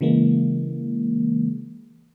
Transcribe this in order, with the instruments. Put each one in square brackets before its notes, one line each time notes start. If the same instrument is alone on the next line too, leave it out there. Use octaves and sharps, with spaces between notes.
[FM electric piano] C#3 E3 G#3 A#3